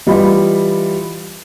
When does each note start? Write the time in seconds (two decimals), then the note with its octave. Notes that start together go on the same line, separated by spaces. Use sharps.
0.06 E3 G3 F4 D#5 B5